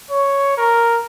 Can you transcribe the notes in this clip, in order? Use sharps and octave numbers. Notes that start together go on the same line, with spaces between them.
C#5
A#4